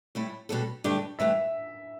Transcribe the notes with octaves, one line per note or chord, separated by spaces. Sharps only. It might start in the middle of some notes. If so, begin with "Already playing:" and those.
A2 G3 E4 A4
B2 G3 D4 A4
G2 D3 A3 D4 G4
G2 E3 A3 D4 G4 E5